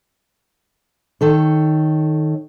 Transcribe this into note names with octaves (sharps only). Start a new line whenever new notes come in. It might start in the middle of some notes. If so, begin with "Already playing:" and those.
D#3 A4 C#5